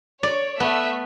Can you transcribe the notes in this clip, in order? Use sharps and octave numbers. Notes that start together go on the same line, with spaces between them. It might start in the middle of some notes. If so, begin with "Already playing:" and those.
C#5 D5
A3 B3 E5